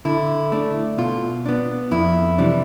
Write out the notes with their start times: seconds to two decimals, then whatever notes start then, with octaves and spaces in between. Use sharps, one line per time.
0.05 D3 E4
0.52 A3 D4
0.98 B2 F4
1.46 B3 D4
1.91 F2 E4
2.38 C3 E3 G3 D4